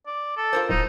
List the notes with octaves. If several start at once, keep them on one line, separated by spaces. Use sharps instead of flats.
D5
A4
F4 A#4 C5
D1 D#4